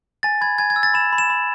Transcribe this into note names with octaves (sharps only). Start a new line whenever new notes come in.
G#5 A6
B5 G#6
G#5 G#6
G#6
E6
A6
B5 E7
B5
E7
B5